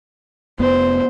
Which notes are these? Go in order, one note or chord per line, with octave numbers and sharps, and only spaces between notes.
F1 F2 B3 C5